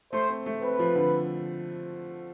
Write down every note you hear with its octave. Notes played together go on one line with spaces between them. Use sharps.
A3 C5
C4
A3
C4 B4
F3
D3